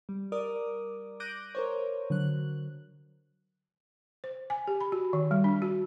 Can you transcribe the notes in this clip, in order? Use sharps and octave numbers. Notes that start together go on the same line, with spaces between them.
G3
A#4 D5 D6 D#6
D6 F#6 G6 A#6 D7 D#7
A#4 C5 C#5
D3 F#3 F#6
C5
G#5
G4
B5
F#4
D#3
G3
D4
F#4